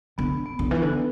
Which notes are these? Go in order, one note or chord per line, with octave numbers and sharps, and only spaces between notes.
D3 B3
B3
D3
E3 B4
D3